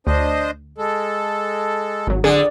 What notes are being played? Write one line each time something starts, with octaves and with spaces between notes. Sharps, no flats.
D2 D4 C5 D#5
G#3 A4
G#1 F#3
F2 D3 G#4 D#6